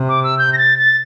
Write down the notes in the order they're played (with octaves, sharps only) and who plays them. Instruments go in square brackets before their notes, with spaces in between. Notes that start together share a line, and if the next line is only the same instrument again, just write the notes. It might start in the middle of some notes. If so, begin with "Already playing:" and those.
Already playing: [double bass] C3
[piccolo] D6
E6
G6
A#6
A6
A6